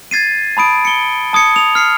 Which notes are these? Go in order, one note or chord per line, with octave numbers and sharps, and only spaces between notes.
G#6 A6 C7 D#7
A5 B5 D#6 D7
C#7 G7
A5 D#6 G#6 C#7
D#6 F7
F6 C7 C#7